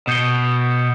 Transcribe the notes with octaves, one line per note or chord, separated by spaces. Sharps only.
B2 D#6 G6 C#7 G7